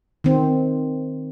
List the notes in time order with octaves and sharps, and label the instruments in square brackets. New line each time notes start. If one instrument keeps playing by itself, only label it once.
[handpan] D#3 C4